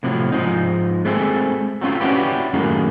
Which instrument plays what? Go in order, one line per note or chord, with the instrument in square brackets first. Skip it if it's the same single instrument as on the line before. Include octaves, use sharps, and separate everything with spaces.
[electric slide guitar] A2 C3 F3 F#3
G#2 F3 G#3 D#4
G#3 A3 C4 G#4 A4
F#3 A3 C4 C#4 F4
C#4 D4 E4 F#4 G4 B4
F#2 A2 D#3 G#3 A#3